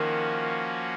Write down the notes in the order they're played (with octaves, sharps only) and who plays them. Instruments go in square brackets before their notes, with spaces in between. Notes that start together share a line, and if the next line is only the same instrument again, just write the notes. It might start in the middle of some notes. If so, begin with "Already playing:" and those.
Already playing: [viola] D#3 [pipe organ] F3 A#3 C#4 F#4